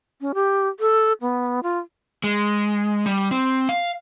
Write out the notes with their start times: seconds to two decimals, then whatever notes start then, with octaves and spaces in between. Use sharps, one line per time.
0.21 C#4
0.34 G4
0.80 A4
1.21 B3
1.63 F4
2.24 G#3
3.06 G3
3.31 C4
3.69 F5